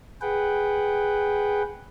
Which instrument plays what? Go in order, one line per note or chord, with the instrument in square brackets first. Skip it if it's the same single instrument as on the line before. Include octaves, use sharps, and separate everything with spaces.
[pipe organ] G#4 B4 F#5 G5